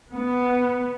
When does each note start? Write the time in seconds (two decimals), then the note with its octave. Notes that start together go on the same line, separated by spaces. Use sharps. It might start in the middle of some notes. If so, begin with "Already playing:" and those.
0.13 B3